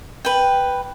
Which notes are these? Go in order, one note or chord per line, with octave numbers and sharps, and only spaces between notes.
B4 G5